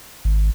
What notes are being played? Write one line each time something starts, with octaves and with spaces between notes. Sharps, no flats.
G#1